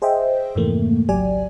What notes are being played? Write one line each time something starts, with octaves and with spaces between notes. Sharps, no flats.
G#4 C5 D#5 E5 G5
F2 G#2 C3 E3 A3 A#3
G#1 C#2 F#3 G4 D5 G#5